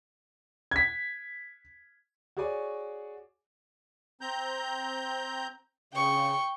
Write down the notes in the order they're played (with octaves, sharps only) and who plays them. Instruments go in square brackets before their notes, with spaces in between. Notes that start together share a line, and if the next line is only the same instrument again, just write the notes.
[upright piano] G#6 B6
[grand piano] F#4 G#4 C#5 D5 G#5
[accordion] C4 A#5 G6
[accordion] C#3 [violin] G5 C#6